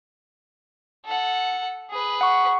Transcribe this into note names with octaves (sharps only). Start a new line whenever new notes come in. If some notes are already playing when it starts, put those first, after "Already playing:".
A4 F#5
G#4 B4
F#5 C#6